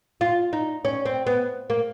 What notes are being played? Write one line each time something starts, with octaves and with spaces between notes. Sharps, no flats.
F4
D#4
C#4
C4
B3
A#3